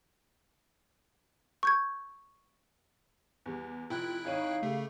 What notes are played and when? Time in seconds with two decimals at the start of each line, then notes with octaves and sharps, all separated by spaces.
1.63 C#6 G6 G#6
3.46 E2 G3
3.90 F1 E4 F4 G5 F#6
4.25 G#1 D#4 C#5 F5 D#7
4.63 C#3 A3 G4